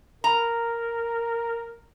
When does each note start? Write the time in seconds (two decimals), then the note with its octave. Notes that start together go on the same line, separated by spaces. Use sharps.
0.24 A#4 A#5